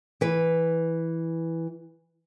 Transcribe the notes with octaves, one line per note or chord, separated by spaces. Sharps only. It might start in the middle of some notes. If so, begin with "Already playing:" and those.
E3 B4